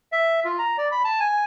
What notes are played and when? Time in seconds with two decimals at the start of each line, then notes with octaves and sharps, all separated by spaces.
0.12 E5
0.45 F4
0.58 A#5
0.78 D5
0.92 B5
1.05 A5
1.20 G#5